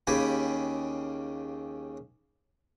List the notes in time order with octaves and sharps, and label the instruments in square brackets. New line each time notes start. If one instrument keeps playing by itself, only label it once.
[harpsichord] D#2 C#3 G4 G#5 B5